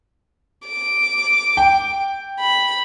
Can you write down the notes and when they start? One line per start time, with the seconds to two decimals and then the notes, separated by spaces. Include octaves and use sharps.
0.68 D6
1.57 G5
2.40 B5